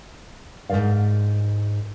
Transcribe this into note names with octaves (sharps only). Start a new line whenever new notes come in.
G#2 F3 A#4 D5 F5